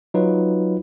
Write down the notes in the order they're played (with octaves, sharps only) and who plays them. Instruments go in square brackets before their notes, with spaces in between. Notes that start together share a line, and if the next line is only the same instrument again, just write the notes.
[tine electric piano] F#3 D#4 F4 B4